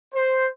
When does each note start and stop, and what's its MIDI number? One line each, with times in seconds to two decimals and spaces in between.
0.14 0.49 72